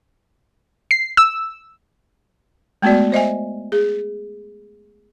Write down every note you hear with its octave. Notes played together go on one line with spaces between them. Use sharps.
C7
E6
G#3 A3 B3 F#4 D5
C5 D#5 E5 G#5
G#4